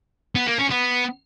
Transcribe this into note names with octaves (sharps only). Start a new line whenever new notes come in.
B3
A#3
C#4
B3